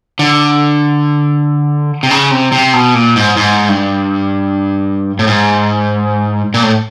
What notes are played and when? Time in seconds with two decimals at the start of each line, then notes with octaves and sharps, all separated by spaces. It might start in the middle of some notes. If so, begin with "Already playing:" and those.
0.19 D3
2.03 C3
2.11 C#3
2.31 C3
2.52 C3
2.73 B2
2.94 A#2
3.16 G#2
3.37 G#2
3.69 G2
5.19 A2
5.27 G#2
6.54 A#2
6.63 A2